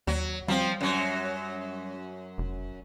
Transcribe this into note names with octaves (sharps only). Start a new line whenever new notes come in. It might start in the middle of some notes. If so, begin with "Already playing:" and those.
D#2 F#3
F3 G3 C4
F#2 F#3
F1